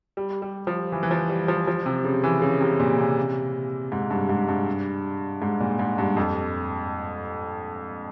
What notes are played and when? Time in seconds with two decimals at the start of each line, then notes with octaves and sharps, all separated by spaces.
0.17 G3
0.42 G3
0.67 F3
0.92 E3
1.03 E3
1.11 F3
1.29 G3
1.48 F3
1.67 F3
1.86 C3
2.04 C#3
2.24 E3
2.42 C#3
2.61 C3
2.80 A#2
2.98 C3
3.92 G#2
4.10 G2
4.29 G#2
4.48 G2
5.42 G#2
5.60 A#2
5.79 G#2
5.98 G2
6.17 F2